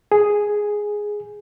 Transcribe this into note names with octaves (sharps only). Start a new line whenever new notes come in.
G#4